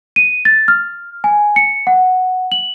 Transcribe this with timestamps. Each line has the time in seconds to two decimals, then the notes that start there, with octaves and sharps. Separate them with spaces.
0.16 D#7
0.45 A6
0.68 F6
1.24 G#5
1.56 C#7
1.87 F#5
2.52 F#7